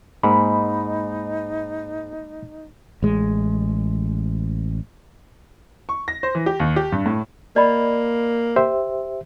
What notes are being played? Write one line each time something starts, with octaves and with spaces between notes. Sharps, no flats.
G#2 G#3 A#3 D#4 B5
A1 G#3
C#6
A#6
C5
E3
G4
D#2
G4
G2
A2
A#3 D5 D#5 B5
G4 C5 E5